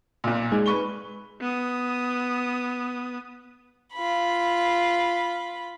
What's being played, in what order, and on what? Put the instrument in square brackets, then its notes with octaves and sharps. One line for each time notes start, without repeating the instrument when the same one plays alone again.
[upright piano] B1 A#2
[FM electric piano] G#3 D#4 G#5
[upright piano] B4 C#6 G7
[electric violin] B3 D#6
[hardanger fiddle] F4 B5